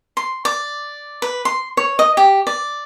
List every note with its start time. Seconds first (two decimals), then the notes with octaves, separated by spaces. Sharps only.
0.17 C6
0.45 D5
1.22 B4
1.45 C6
1.77 C#5
1.99 D#5
2.17 G4
2.47 D5